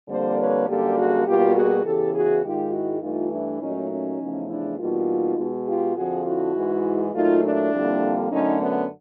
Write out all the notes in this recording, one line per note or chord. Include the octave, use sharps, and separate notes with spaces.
F2 D3 G3 A#3 C5 D5
B4 C#5
F#2 D3 G3 A#3 G4 A4
F#4 G#4
B2 G3 A#3 F4 G4
F#4 G#4
E2 C#3 E3 G4 A4
F#4 G#4
G#2 D#3 G#3 F4 G4
E4 F#4
G2 E3 A3 D#4 F4
D4 E4
A#2 F#3 A3 C#4 D#4
C#4 D#4
E2 C#3 F3 A3
D4 E4
E2 B2 G3 A#3 D#4 F4
B2 G#3
F4 G4
F2 D3 F3 F#4 G#4
E4 F#4
G#2 E3 G#3
A#2 F#3 A3 D#4 F4
D4 E4
F2 D3 G3 A#3
F#2 D3 F#3 A3 C#4 D#4
B3 C#4